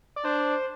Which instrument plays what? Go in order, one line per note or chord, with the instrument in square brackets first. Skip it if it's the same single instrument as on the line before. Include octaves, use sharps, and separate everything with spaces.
[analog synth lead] D5
[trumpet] D4 [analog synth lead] C5